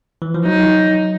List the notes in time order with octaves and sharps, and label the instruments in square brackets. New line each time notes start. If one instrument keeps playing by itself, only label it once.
[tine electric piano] E3
F3
[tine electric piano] F#3 [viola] D#4